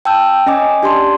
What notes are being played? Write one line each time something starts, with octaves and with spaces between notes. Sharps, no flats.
G5 A5 E6 G6
C#4 D#5 G#5 D6
D4 G4 D5 A5 C6